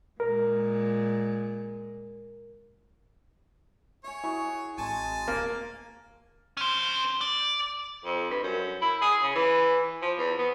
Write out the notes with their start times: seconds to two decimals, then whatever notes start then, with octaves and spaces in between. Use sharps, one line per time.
0.20 A#2 G#3 A#4
4.04 C#5 E5 G#5
4.24 E4 F#4 G#4
4.78 A1 G#3 C4 G#5 A5
5.28 D#1 A#3
6.57 C#4 C5
7.21 D5
8.05 F2
8.30 G2
8.43 F#2
8.81 E4
9.01 G#4
9.23 C#3
9.35 E3
10.02 F3
10.18 E2
10.38 B3